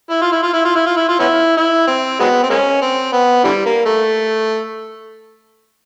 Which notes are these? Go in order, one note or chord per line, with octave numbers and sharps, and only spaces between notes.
E4
F4
E4
F4
E4
F4
E4
F4
E4
F4
B3 C#4 E4
E4
C4
F#3 G#3 B3
C4
G#3 A#3 C#4
C4
B3
D3 E3 G3
A#3
A3